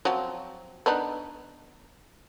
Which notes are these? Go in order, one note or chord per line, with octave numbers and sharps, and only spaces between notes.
F3 F#3 C4
B3 D4 D#4